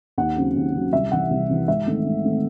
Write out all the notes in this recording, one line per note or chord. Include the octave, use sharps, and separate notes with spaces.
D#2 F#5
C#3 F#3 C4
D#2
C#3 F#3 C4
C2 E5
C3 E3 F#5
C2
C3 E3
G#2 E5
D#3 A3 C4
G#2
D#3 A3 C4